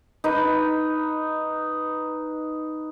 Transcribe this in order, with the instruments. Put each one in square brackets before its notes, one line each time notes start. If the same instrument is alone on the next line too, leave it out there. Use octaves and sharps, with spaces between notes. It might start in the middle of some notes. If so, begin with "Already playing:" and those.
[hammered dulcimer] D#4 B4